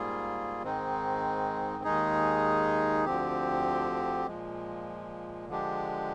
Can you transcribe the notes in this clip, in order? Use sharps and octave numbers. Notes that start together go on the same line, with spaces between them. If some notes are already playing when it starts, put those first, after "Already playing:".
Already playing: G#2 G3 A#3 F4 G#4
G#2 D#3 G#3 C4 D#4
D#2 D#3 G#3 D#4 G#4
D2 D3 F3 C4 G4
A#2 F3 G#3
D3 F3 G#3 D4 G4